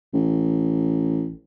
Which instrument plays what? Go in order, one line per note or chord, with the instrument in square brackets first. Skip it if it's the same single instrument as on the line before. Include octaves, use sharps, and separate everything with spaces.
[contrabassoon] A1